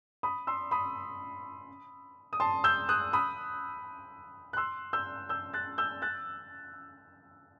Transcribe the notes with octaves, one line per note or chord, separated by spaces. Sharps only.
B5 D#6
C6 E6
B5 D#6
D#6
A5 C6
E6 G6
D#6 F#6
B5 D#6
F#6
C6 E6
E6 G6
E6 G6
F#6 A6
E6 G6
F#6 A6